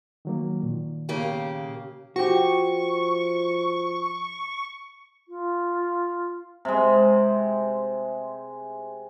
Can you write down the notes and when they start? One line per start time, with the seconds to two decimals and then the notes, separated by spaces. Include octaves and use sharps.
0.25 D#3 F#3 A#3
0.63 A#2 D#3
1.09 C#3 A#3 G4
2.16 F3 F#4 G4 C#6
5.29 F4
6.65 C3 G#3